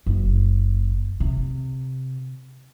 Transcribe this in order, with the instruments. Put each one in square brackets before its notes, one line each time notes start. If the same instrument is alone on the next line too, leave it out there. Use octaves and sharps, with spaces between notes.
[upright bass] F#1
C3